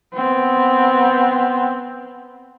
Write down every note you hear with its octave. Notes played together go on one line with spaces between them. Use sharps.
B3 C4